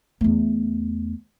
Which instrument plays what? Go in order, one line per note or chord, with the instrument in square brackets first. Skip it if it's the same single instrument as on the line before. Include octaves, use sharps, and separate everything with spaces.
[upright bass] E2 A3